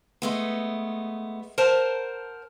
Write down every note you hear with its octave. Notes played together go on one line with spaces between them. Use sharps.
G#3 A3 B3
A#4 C5 F#5 A5